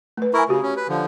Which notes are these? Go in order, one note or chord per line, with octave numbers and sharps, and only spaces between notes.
A3 B4
E4 A#4 G#5 C#6
C#3 F#4 G4
C#4
B4
D3 F3